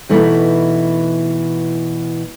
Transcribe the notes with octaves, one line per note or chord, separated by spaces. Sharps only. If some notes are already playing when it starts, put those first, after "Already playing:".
B2 E3 A3 D#4